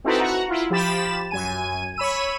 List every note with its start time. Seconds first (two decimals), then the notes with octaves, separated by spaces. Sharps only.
0.04 C4 D#4 E4 F#4 A4 B4
0.20 F#4 F#5 A#5
0.48 E4 F4
0.70 F3 G4 B5 A6 E7
1.31 F#2 G#5 D#7
1.96 C#5 B5 E6 D#7